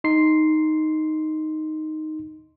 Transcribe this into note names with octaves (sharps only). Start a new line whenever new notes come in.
D#4 C6 C7